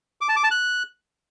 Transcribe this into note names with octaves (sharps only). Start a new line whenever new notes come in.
D6
A5
D6
A5
F#6